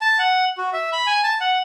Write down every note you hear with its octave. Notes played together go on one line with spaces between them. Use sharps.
A5
F#5
F#4
E5
B5
G#5
A5
F#5